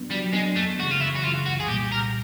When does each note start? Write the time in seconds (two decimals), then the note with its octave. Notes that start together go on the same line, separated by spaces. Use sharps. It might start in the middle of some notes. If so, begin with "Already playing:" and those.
Already playing: F#3 B3 D4
0.10 F#3 G3
0.33 G#3 B3 D4
0.56 F#2 A3
0.78 C#3 E3 G#3 F#4
0.91 F4
1.00 F#2 E4
1.16 F#4
1.24 C#3 E3 G#3 F4
1.46 C2 F#4
1.60 G#4
1.68 A#2 G3 G4
1.92 C2 A#4